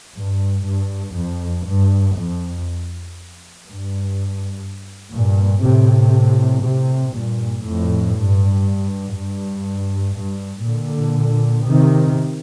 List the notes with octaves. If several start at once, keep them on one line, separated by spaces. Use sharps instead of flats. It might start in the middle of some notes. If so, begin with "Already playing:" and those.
G2
G2
F2
G2
F2
G2
G2 A#2
A2 C3
A2 C3
G2 A#2
F2 A2
G2
G2
G2
A#2 D3
C3 D#3